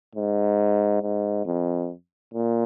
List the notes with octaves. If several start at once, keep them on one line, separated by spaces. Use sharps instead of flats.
G#2
G#2
F2
A#2